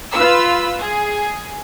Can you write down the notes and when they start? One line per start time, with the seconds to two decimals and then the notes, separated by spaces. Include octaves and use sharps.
0.15 F4 B4 E6
0.80 G#4